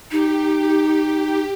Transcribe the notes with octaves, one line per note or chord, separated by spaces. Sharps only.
D#4 G4